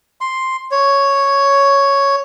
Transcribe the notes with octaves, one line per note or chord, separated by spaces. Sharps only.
C6
C#5